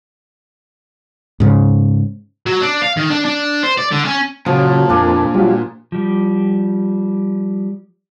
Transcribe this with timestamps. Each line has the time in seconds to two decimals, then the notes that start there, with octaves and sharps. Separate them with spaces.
1.40 G#2 C#3
2.46 F#3
2.61 D4
2.82 F5
2.97 D#3
3.10 D4
3.25 D4
3.63 C5
3.78 D5
3.91 D3
4.05 C#4
4.46 A#2 C#3 F3 F#3
4.89 F2 A#3 D4 G#5
5.34 F#3 G3 F4
5.92 F3 G3